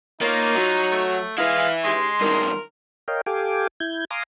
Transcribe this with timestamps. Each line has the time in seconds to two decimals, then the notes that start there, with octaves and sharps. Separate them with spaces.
0.21 A#3 D#4 F4 C#5
0.56 F#3
0.92 A3
1.38 G#3 E4 B4 F5
1.84 G#3 C#4 D#4 G4 C6
2.21 G2 D#3 A#4
3.08 A#4 C#5 D#5 F5 G5
3.26 G4 A4 F5 G5 G#5 D6
3.80 E4 G6 G#6
4.11 F5 G#5 A#5 C6 D6 D#6